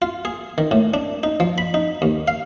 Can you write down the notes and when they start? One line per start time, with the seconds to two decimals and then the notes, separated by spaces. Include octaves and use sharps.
0.02 F4
0.25 G#4
0.58 D#3
0.71 A2
0.94 D4
1.23 D#4
1.40 F3
1.58 B5
1.74 D#4
2.02 D#2
2.28 F5